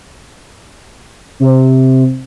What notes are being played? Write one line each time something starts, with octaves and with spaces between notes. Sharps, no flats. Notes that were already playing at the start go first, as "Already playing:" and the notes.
C3